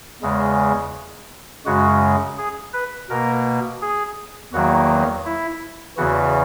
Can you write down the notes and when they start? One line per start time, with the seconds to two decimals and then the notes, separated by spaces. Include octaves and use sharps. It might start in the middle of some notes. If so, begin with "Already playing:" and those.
0.22 E2 C#3 G#3
1.66 F#2 C#3 G#3 F#4
2.38 G#4
2.73 B4
3.10 B2 A#3 A#4
3.82 G#4
4.53 E2 D#3 F#3 A#3 F#4
5.25 E4
5.97 E2 C#3 E3 F#4